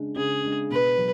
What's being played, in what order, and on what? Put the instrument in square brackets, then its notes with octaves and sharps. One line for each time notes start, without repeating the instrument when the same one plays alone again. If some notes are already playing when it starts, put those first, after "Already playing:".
Already playing: [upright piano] C#3 G#3 D4
[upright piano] C#3 [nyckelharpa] G#4
[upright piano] G#3 D4
[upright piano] B2 [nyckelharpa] B4
[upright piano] F#3